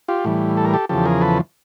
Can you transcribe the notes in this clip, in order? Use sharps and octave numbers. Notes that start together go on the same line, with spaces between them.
F4 G4
A2 E3 G3
A4
A#4
G4 A4
E2 C#3 F3 G4 A4
G#4 A#4
A4 B4